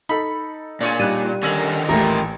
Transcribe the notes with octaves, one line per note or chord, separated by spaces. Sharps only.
D#4 A4 B5
A#2 D4 G#4 C#5 D5
G3 D#4 F#6 D#7
D3 D#3 C#4 A#4 E6 F#7
A1 A#2 D#3 A3 E4 G4 A#4